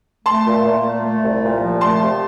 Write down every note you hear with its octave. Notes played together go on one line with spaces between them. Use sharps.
A3 A5 C6
A#2
A#2
A3
A3
C2
A#2
F3
A3 A5 C6
C3